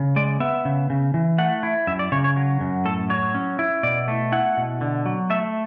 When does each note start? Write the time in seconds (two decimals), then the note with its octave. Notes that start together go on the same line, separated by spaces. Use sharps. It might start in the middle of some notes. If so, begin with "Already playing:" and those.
Already playing: C#3
0.16 G#3 D5
0.40 B3 E5
0.65 C#3
0.90 C#3
1.14 E3
1.38 A3 F#5
1.63 E4
1.87 F#2 E5
1.99 D5
2.12 C#3 C#5
2.24 C#5
2.36 F#3
2.61 F#2
2.85 A2 A4
3.10 F#3 C#5
3.34 C#4
3.59 E4
3.83 B2 D5
4.08 A3
4.32 E4 F#5
4.57 B2
4.81 D3
5.06 F#3
5.30 A3 E5